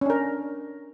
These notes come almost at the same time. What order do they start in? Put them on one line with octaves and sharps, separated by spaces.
C#4 D4 A#4